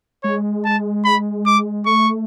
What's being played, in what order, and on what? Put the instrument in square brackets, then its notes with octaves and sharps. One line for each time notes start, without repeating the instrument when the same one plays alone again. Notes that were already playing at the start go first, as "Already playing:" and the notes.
[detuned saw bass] G#3 [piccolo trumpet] C#5
[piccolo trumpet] A5
B5
D6
[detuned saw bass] A3 [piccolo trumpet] C#6